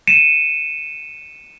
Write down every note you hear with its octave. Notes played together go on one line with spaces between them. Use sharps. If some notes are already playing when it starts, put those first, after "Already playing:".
C#7 D#7 E7